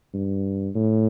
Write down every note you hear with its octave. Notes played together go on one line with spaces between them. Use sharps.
G2
A2